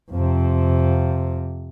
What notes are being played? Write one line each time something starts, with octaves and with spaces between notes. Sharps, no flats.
F2 C3